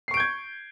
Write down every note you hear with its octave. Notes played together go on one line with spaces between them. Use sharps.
C#6 G6 G#6 C7 D7